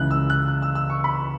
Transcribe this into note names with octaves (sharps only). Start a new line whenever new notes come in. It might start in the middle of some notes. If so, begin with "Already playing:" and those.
Already playing: C#2 C#3 E3 F#6
E6
F#6
F#6
E6
E6
C#6
B5